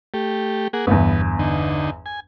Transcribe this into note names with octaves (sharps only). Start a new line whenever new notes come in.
A3 G4
A#3 G#4 F#5
G1 E2 B3
D3 D#4
G#5